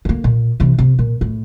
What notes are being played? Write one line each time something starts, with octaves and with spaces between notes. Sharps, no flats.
D3 A#3
A#2
C3 E3
C3
A#2
A2